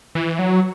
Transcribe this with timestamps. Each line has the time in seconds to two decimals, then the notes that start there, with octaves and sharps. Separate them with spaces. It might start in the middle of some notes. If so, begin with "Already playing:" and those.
0.15 E3
0.39 F#3